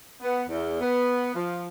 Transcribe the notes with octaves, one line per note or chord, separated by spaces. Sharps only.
B3
E2
B3
F3